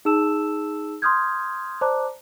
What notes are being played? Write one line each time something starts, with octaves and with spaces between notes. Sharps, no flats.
D#4 G#4 A5 E6 E7
C6 D6 D#6 F6 G6 G#6
C5 D5 A5 A#5 D6 F#6